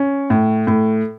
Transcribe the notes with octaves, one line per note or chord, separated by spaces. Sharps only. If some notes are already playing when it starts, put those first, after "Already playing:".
Already playing: C#4
A2
A2